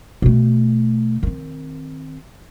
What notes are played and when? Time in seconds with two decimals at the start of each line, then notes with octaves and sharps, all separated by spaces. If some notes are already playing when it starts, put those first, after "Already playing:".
0.22 B2 A3
1.23 D#3 C4